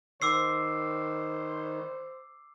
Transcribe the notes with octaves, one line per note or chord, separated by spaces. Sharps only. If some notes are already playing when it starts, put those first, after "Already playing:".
D#3 C5 D6 E6 C7